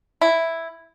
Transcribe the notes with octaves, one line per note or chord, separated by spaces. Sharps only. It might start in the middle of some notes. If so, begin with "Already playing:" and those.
E4